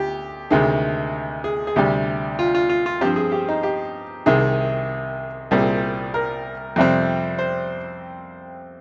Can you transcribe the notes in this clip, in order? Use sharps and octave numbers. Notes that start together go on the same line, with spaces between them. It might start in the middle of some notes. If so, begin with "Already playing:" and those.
Already playing: D2 G4
D2 C3 D#3 G#3
G#4
G#4
D2 C3 G3 G4
F4
F4
F4
F4
G2 F3 C4 G4
G#4
G4
D#4
G4
C2 C3 D#3 G#4
C2 A#2 G3 C4 G#4
A#4
F2 C3 G3 C4
C5